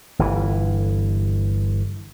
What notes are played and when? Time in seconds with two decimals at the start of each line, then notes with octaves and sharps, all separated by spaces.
0.19 G1 E3